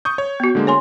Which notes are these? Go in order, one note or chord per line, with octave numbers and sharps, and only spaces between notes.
C#6 D#6 G6
C#5
B3 F#4
D3 G#3 A#3
C#5 G#5 C6